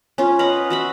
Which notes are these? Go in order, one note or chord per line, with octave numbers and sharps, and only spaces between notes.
C#4 F4
B4 D#5 F5 F#5
F#4 E5 B5